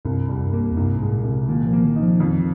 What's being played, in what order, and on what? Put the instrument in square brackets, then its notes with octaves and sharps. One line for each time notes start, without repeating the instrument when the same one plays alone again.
[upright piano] C2 [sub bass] G2
[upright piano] G3
[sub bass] F2
G2
[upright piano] A#3
[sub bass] F2
[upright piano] C2 [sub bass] G2
[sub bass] G#2
[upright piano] G#3
[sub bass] A#2
[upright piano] C2
[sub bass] C3
[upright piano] A#2 [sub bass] D#3
[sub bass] F3
[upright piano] A#3
[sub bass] D#3
[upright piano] D#4
[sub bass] F3
[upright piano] F2 [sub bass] D#3